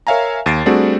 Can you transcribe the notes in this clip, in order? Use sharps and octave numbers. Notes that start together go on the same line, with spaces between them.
A#4 C#5 E5 F5 G#5 A#5
D#2 A6 C7 D7
G3 A3 C4 D4 F#4 G#4